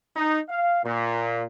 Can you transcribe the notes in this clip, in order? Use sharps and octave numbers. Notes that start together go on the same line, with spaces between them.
D#4
F5
A#2